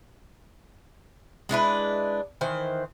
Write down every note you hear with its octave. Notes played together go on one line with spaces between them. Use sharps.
G#3 D4 E4 B4
D#3 E3 C5